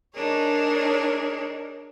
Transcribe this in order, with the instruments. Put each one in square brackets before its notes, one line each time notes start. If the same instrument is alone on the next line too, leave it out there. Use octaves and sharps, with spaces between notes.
[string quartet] D4 D#4 G#4 A#4 C#5